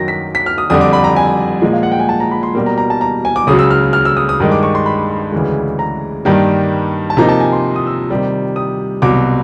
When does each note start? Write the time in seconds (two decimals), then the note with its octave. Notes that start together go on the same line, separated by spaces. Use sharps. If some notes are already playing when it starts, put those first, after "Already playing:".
Already playing: F#2 D#3 F#3 A#6
0.08 B6
0.35 B6
0.46 F6
0.58 D#6
0.70 F2 D3 G3 D#6
0.81 D6
0.93 B5
1.04 A#5
1.16 G#5
1.62 A#2 F3 G#3
1.73 F5
1.83 F#5
1.92 G5
1.99 G#5
2.09 A5
2.20 A#5
2.31 B5
2.43 C6
2.55 B2 G3 A#3
2.66 A#5
2.78 A#5
2.90 A5
3.01 A#5
3.25 G#5
3.36 D6
3.47 C#2 C#3 F#3 D#6
3.59 E6
3.71 F6
3.93 F6
4.05 E6
4.17 D#6
4.29 D#6
4.40 G2 D#3 G#3 D#6
4.52 D6
4.63 C#6
4.75 C6
4.86 B5
5.32 D2 C#3 E3 G#3
5.79 A#5
6.25 G2 D#3 G3 A#3
7.10 A5
7.17 C3 F3 A#3 D#4 A#5
7.29 A5
7.40 G#5
7.52 C6
7.76 D#6
7.87 E6
8.10 C3 D#3 G3
8.56 D#6
9.02 C2 B2 F#3 D6